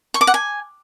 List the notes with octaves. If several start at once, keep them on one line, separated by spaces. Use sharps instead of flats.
C#6
D6
F#5
G#5